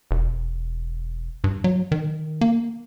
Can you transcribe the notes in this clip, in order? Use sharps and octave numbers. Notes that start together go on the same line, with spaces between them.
E1
G2
F#3
D#3
A#3